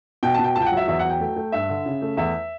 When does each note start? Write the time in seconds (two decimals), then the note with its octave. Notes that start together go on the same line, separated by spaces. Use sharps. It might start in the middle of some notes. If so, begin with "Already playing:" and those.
0.23 B2 G5
0.34 B2 A5
0.44 G5
0.56 C#2 A5
0.62 G5
0.66 F#5
0.72 F#3
0.77 E5
0.87 E2 E5
0.99 F#3 F#5
1.09 G5
1.20 A3
1.36 A3
1.52 G2 E5
1.69 D3
1.86 C#3
2.02 A3
2.17 E2 E5